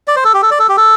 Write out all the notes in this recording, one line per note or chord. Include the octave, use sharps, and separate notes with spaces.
D5
C5
A4
G4
A4
D5
A4
G4
A4